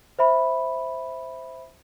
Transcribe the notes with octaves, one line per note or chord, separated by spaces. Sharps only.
C5 E5 B5